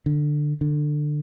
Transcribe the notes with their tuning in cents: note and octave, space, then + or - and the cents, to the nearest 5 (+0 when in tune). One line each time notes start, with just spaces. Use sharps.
D3 +15
D3 +20